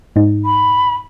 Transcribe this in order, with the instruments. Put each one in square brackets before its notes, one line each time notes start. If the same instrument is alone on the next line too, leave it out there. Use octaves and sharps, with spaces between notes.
[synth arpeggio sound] G#2 D#4
[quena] B5